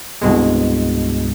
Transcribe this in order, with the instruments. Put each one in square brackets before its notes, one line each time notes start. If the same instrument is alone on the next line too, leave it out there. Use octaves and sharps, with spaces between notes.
[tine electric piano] C2 G2 B2 G#3